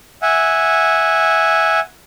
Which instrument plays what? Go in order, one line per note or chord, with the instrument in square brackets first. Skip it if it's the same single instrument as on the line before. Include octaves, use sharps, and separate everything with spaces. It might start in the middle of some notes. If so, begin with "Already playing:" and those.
[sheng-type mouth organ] E5 F#5 G#5